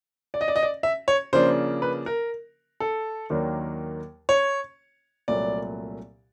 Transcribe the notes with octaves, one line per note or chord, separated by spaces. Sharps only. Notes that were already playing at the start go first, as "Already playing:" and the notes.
D5
D#5
D5
D#5
D5
E5
C#5
C#3 F3 A#3 D4 C5
B4
A#4
A4
D#2 D#3 F#3 A#3 D4
C#5
C2 A#2 F#3 A3 D5